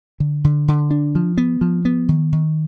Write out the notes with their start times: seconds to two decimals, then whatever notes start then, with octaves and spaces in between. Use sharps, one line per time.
0.20 D3
0.44 D3
0.68 D3
0.91 D4
1.15 F3
1.38 B3
1.61 F3
1.85 B3
2.09 D#3
2.33 D#3